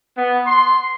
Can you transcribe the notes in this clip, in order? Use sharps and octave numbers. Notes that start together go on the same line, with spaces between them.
B3
C6